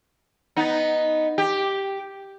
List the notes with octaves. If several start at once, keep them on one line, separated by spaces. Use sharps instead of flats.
B3 D#4
G4